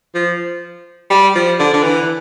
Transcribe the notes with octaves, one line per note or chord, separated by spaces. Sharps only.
F3
G3
F3
D3
D3
E3